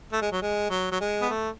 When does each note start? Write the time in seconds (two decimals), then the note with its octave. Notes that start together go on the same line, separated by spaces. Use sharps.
0.13 A3
0.22 G#3
0.32 F#3
0.42 G#3
0.70 F#3
0.91 F#3
1.01 G#3
1.22 B3
1.29 A3